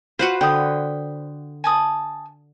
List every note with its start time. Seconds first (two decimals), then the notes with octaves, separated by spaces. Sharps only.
0.19 F4 F#4 B4 C5 F#5
0.41 D3 G5 D#6
1.64 G#5 A5 D#6